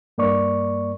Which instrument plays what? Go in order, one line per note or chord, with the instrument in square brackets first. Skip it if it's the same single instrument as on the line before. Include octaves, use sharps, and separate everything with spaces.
[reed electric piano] G2 A#3 D5 C#6